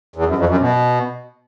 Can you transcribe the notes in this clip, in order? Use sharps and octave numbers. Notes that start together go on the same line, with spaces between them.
E2
F#2
F2
F#2
B2